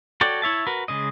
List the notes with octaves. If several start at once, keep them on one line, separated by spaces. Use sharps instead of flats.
F#4 A4 C#5 D5 G5
E4 C#5 E5 A5
F#4 A#4 B4
C#3 G#3 D#5